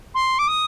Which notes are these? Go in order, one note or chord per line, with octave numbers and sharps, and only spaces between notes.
C6
D6
D#6